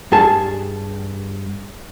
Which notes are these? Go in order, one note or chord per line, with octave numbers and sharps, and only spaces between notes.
G2 G#4 A5